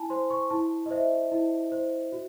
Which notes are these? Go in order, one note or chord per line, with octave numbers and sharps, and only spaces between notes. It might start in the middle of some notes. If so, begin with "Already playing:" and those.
Already playing: E4 G#5 A5
C5 C6
C#6
E4 A5
D#5
C5 E5
E4
C5
F#4